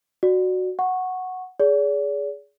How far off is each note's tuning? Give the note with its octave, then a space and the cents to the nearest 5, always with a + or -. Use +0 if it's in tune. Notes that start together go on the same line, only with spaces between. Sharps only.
F#4 +0 D5 +20
F#5 +0 C#6 -10
G#4 +0 D5 -45